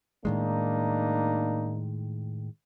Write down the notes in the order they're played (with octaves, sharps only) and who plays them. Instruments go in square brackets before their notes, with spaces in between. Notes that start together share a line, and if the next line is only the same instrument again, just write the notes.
[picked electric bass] A2 D#3 G#3 [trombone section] A#3 D4 D#4